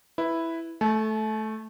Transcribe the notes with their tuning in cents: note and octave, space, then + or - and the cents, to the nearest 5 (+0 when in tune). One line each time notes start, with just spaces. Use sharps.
E4 +0 B4 +0
A3 -10 A5 -40